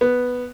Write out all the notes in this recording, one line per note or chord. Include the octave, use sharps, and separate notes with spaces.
B3